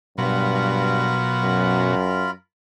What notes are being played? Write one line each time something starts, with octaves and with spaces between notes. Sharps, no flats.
G2 B2 F#3 F4 A#4 B5
F#2